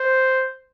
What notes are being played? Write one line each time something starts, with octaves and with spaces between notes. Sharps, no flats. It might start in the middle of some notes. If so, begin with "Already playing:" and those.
Already playing: C5